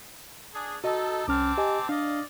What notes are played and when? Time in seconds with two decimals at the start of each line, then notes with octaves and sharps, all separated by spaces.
0.54 D4 G#4
0.84 D#4 F#4 A4 D#5
1.28 C2 C4 C#4 A5 D6 F6
1.58 G4 D#5 G#5
1.89 D4 D5 D#5 F5